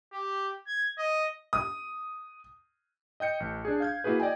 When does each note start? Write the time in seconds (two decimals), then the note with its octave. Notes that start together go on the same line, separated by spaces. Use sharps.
0.13 G4
0.68 G#6
0.98 D#5
1.53 D#6
3.20 D#5 G5 G6 C#7
3.40 A1
3.65 D4 G#4
3.80 F5 G6 G#6
4.04 A#3 E4 F#4 G#4 B4
4.20 D5 D#5 G5 G#5